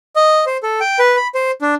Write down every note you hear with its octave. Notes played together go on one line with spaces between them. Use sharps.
D#5
C5
A4
G5
B4
B5
C5
D4